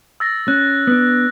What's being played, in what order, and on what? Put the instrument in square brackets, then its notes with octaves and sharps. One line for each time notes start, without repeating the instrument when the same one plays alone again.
[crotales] E6 A6 A#6
[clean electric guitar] C#4 [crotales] F#6
[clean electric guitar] B3 D4